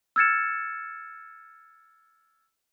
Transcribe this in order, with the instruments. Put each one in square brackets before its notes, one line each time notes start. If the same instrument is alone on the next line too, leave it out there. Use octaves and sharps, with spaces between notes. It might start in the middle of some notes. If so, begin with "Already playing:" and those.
[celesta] E6 F6 G#6 A6 C#7 E7